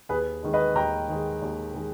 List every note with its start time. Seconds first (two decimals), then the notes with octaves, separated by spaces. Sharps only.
0.09 D#2 G#4 B4
0.43 D#3 G#3
0.54 B4 D#5
0.75 D#2 G5 A#5
1.08 D#3 G#3
1.42 D#2
1.75 D#3 G#3